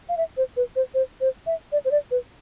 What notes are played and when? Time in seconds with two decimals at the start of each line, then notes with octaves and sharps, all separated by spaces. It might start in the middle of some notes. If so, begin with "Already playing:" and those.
0.09 F5
0.17 E5
0.37 C5
0.57 B4
0.76 C5
0.94 C5
1.21 C5
1.46 E5
1.72 D5
1.85 C5
1.91 D5
2.11 B4